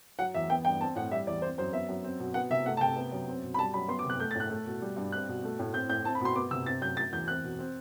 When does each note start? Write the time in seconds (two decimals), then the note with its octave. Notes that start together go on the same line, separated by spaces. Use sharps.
0.19 F#3 F#5
0.34 E2 E5
0.50 B3 G5
0.65 G2 G5
0.81 C4 A5
0.95 A2 F#5
1.11 G3 E5
1.27 E2 D5
1.42 C4 C5
1.58 F#2 C5
1.73 B3 E5
1.89 F#2
2.04 C4
2.20 B2
2.34 B3 F#5
2.50 C3 E5
2.66 A3 F#5
2.77 A5
2.81 C3 G5
2.96 B3
3.12 F#2
3.28 C4
3.43 B2
3.54 B5
3.58 G3 A5
3.74 F#2 B5
3.88 B3 C6
3.99 D6
4.04 C3
4.10 F#6
4.19 A3 G6
4.31 A6
4.35 A2 F#6
4.50 A3
4.66 B2
4.82 G3
4.96 G2
5.12 C4 F#6
5.28 B2
5.44 A3
5.59 A2
5.73 C4 G6
5.89 A2 G6
6.04 C4 A5
6.15 B5
6.20 B2 C6
6.36 B3 D6
6.51 C3 E6
6.66 C4 A6
6.81 F#2 G6
6.97 F#3 A6
7.12 E2 G6
7.28 C4 F#6
7.44 B2
7.59 C4